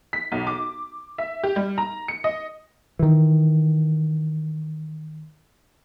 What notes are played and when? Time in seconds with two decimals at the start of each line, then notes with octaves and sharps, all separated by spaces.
0.13 B6
0.32 B1
0.47 D6
1.18 E5
1.43 G4
1.56 G3
1.78 A#5
2.08 C#7
2.24 D#5
2.99 D#3 E3